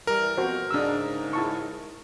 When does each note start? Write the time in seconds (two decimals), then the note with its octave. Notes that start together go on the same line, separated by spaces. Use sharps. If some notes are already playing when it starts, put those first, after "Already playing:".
0.07 E3 G3 A#4
0.37 F2 B2 F#4 C5
0.71 G#2 C#3 D4 E6
1.33 E4 A5 C#6